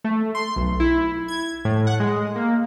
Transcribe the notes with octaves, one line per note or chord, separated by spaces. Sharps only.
A3
C6
B1
E4
G#6
A2
F#5
G#3
A#3